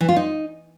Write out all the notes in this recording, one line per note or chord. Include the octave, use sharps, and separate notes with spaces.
E3
F4
D#4